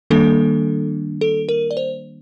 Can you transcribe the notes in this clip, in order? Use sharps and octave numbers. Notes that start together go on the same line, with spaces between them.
D#3 G3 A#3 D4 A4
A4
A#4
D5
C5